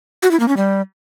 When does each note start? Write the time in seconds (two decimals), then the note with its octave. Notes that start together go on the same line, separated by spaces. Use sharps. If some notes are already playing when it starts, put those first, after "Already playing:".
0.23 F#4
0.31 E4
0.40 A#3
0.48 C#4
0.57 G3